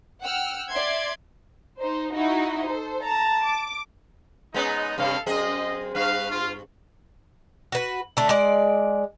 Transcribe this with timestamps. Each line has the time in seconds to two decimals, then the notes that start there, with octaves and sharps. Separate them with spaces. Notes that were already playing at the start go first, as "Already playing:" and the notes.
0.22 F#5 G5 E6 F6
0.70 D5 E5 C6 G#6
1.79 D#4 C5
2.13 D#4 E4 F#4
2.66 A4 C5
3.04 A5 A#5
3.44 D6
4.54 G#3 B3 C#4 D#4
4.98 G2 C3 D#4 A4 F5
5.26 F#2 C4 G#4 D#5
5.95 G2 B4 F5
6.32 F4
7.72 F#4 B4
8.17 D3 A3
8.29 G#3 D5